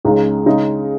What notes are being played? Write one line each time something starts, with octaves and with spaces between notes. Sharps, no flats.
C#2 C#3 G#3 D#4 G#4
C#3 G#3 D#4 G#4 D#5